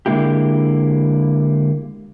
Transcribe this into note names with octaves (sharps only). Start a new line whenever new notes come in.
D3 G#3 A#3 E4 G4